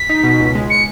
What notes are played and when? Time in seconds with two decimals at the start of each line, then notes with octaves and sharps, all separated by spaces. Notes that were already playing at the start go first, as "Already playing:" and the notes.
Already playing: B6
0.09 D#4
0.24 B2
0.40 C#2
0.55 G#3
0.70 C#7